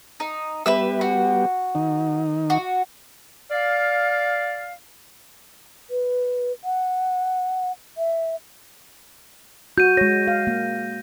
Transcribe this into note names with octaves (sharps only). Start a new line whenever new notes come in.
D#4
G3 B3 G4 B4 E5 E6
F#4
D#3 D#4
F#4
D5 F5
B4
F#5
E5
F#4 G6 D#7
G#3 C#5 A#6
F5
A#3